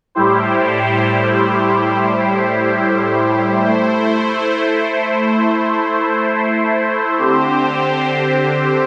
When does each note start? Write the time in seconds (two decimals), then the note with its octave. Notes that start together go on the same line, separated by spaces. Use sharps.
0.15 A2 G3 E4 G4 C5
3.65 A3 E4 C5
7.16 D3 C4 G4 C5